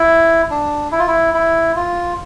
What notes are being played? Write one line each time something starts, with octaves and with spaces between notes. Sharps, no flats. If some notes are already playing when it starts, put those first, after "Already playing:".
Already playing: E4
D4
E4
F4
E4
E4
F4